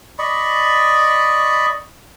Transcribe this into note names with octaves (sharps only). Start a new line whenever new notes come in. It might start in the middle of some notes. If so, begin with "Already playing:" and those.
D5 D#5 B5 C#6